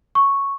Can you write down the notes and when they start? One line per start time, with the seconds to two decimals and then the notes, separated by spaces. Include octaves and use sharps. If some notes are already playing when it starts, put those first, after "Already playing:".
0.15 C#6